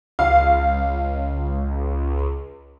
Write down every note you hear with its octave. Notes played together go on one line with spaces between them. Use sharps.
C#2 F5